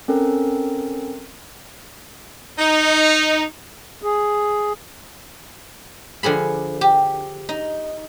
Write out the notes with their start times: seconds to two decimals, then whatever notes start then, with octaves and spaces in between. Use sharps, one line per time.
0.08 C4 C#4 A4 A#4
2.59 D#4
4.03 G#4
6.23 D3 F3 G#4 B5
6.81 G4
7.49 D#4